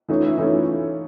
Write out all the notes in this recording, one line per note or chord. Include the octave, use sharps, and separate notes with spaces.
E3 A3 C#4 D#4 F4
E4
E3 A3 C#4 D#4 F4